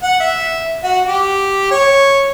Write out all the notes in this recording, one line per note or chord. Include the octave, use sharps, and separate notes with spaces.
F#5
E5
F#4
G4
C#5